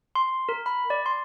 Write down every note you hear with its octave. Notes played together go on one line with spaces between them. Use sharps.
C6
A#4
B5
D5
C6